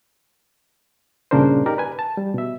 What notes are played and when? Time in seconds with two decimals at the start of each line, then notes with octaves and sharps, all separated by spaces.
1.31 G2 A#2 C#3 D4 A#4 C5
1.66 D#4 G4 A#4 D5
1.78 B4 G#5
1.99 A5
2.17 G3
2.34 B2 E5